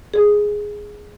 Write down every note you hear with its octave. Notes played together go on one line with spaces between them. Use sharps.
G#4